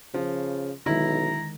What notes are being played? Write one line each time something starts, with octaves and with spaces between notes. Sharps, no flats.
C#3 F3
B1 D3 D#3 G#3 E4 A#5